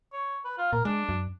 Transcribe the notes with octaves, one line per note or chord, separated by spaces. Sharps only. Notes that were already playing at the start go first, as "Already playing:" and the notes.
C#5
B4
F4
A#2 A#4
G#3 D4
F#2